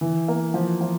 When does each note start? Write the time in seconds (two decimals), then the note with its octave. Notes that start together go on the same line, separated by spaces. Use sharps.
0.01 E3
0.28 A#3
0.54 F3
0.81 F3